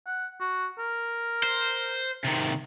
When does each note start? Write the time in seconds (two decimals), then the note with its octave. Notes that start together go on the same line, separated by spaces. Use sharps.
0.07 F#5
0.40 F#4
0.79 A#4
1.43 C5
2.25 C3 D#3